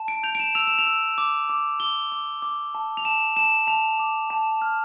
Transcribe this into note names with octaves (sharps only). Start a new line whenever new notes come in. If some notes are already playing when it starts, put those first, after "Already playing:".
Already playing: A5
D7
G6 F7
D7
E7
E6 F7
E7
F7
E6
D6
D6
D6 G7
D6
D6
A5
F7
A5 E7
A5 E7
A5 F7
D6
A5
F6